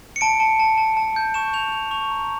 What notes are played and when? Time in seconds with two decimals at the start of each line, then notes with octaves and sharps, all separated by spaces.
0.16 C#7
0.21 A5 D7
0.40 A5
0.60 A5
0.78 A5
0.97 A5
1.16 G6
1.34 C#6 E7
1.53 G6 F7
1.72 G6 F7
1.91 C#6 F7
2.10 A#5